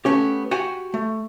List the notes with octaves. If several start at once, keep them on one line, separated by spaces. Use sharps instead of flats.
A3 B3 C#4 G4
F#4 G4 F#5 G#5
A3